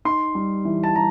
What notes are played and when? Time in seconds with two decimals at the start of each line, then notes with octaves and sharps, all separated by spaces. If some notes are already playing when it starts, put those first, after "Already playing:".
0.05 D#4 C6
0.35 G3
0.65 E3
0.84 A5
0.96 G3 A#5